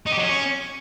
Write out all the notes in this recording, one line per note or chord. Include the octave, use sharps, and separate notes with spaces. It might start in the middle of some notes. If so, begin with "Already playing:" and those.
D#4
G4
F#3
C#4